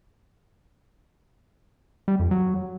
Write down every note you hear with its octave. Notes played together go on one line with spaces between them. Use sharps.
G3
F2
F#3